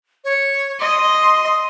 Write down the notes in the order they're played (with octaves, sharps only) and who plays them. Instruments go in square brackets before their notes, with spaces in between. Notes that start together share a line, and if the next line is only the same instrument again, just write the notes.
[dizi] C#5
[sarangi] D#5 [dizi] C6